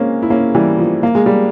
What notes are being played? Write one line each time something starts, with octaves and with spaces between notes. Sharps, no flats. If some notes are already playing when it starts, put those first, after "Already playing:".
Already playing: G#3 A#3 C4 C#4
E4
A#3 C#4
E3 G3
F3
A#3
G#3
G3